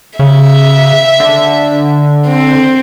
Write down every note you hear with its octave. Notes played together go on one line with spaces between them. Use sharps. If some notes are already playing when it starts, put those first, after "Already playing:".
C#3 E5
D3
C4